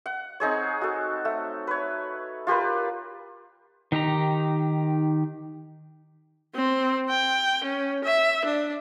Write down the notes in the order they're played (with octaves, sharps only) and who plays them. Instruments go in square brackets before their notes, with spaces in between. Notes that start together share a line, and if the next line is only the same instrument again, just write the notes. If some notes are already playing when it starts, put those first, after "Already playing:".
[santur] F#5
C4 D#4 G#4 C#5
F#4 A4
A3
B4 C#5
F4 G4 A#4 B4
[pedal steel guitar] D#3 D#4 G4 A#5
[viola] C4
G5
C#4
E5
D4